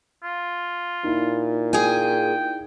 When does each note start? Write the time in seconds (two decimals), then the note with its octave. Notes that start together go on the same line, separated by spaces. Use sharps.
0.24 F4
1.04 A#2 D#4 E4
1.73 G#4 G5 G#5